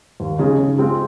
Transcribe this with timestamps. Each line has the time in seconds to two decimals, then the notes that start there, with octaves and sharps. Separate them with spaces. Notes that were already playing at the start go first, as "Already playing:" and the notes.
0.20 D#2
0.39 C#3 G#3 D#4 G#4
0.59 C#3
0.78 G#3 C4 F4